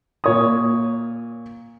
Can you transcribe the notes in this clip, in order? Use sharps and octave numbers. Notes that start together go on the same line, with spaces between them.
A#2 C#5 D#6